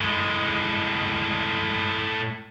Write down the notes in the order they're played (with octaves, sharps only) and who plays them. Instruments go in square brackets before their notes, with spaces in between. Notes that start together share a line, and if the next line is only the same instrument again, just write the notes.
[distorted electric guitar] A2 G#3